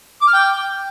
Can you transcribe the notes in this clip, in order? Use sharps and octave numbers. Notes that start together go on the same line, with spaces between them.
D6
F6
G5